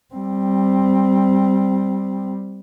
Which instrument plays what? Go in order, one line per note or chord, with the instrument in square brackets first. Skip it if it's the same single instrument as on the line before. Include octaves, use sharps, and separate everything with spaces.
[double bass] G3 C4